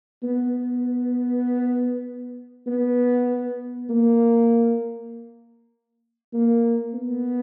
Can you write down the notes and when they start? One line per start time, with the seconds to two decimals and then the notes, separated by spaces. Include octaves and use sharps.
0.23 B3
2.67 B3
3.89 A#3
6.33 A#3
6.94 B3